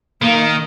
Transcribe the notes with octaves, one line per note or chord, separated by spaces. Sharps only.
D#3 A#3